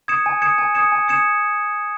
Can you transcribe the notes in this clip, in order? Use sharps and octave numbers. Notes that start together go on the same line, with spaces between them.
D#6 G#6 C#7 E7
G#5
D#6 G#6 C#7 E7
G#5
D#6 G#6 C#7 E7
G#5
D#6 G#6 C#7 E7